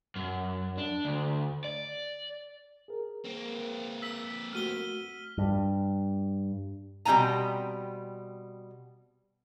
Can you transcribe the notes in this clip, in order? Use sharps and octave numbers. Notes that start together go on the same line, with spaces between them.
F#2
D4
D2
D5
G#4 A#4
A#3 C4
E6 B6
A3 F#4 F6 D#7 G7
G2
B2 G3 C4 D4 G#5 A#5